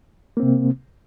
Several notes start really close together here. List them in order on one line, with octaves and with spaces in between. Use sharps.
A#3 C4 C3